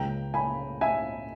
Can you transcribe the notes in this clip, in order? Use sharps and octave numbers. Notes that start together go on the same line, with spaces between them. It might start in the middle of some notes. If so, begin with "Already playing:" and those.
Already playing: C#2 C#3 G#3 G5 A#5
G#5 B5
E5 G#5